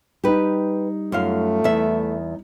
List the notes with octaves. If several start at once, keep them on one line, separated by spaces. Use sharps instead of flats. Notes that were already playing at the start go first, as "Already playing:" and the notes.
G3 D#4 G4 B4
F#2 A3 F4 F5
E2 E5